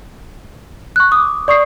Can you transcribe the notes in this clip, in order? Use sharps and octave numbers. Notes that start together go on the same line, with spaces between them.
C#6 F#6
D6 D#6
D5 C#6 D#6 C7